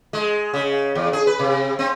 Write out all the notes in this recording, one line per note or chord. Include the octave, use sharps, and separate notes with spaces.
G#3
C#3
E2
G#4
B4
C3
C4